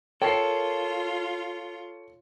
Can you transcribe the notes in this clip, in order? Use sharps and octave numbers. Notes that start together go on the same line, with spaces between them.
F4 A4 A#4 C#5 G5 C7